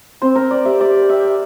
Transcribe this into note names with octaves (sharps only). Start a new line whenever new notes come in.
C4 C5
A#4
D5
G4 E5
D5
E5